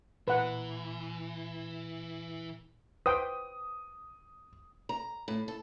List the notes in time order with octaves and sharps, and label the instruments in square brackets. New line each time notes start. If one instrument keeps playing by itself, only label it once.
[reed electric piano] A#2 A#5 [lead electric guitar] E3 [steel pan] B4 F#5
[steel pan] B4 C5 G5 [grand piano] D#6
[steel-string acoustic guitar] A#5
A2
A4